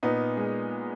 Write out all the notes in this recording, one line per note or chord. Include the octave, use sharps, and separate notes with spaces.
A#2 B3 D#4
G#3